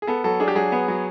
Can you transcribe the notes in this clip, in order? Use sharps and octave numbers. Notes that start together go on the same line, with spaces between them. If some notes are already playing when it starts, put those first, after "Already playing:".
G#4
B3 A4
F#3 A4
D4 G#4
G4
F#3 G#4
B3
F#3